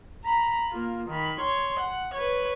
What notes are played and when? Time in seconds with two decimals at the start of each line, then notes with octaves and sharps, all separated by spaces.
0.24 A#5 B5
0.69 A#3 F4
1.08 D#3 B5
1.40 C#5 C6
1.79 F#5
2.14 B4 C#5